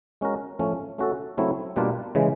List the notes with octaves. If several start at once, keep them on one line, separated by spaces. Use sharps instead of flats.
G#3 C#4 F#4 A#4
A2 F3 A3 C#4
A3 C#4 F#4 A4
C#3 F#3 A3 C4 E4
B2 G3 A#3 D4 F4
C#3 E3 G#3